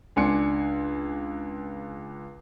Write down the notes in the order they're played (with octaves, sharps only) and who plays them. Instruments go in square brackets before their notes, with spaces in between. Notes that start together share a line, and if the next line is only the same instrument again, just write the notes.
[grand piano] C#2 D4 G#5 C6 C#7